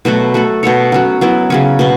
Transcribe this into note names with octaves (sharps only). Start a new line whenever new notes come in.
B2 F#3 A3 F#4
A3 F#4 A4
B2 B3 A4 C#5
F#3 C#4 F#4
F#3 B3 E4
C#3 F#3 C#4
B2 B3